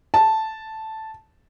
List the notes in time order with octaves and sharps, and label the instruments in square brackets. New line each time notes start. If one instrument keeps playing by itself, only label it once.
[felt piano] A5